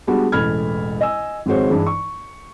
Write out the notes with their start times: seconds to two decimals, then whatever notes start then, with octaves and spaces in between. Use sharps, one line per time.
0.07 G3 G#3 B3 D4 F#4
0.32 E1 A1 A4 B5 F6 G#6
1.01 D#5 G#5 E6
1.46 G#1 F2 G#3 F#4 C5 C#5
1.69 G2 E3 G#3
1.87 C#6